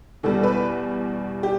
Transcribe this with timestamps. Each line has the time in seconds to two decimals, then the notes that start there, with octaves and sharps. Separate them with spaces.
0.23 E2 B2 G3 A4
0.43 B4
1.43 G4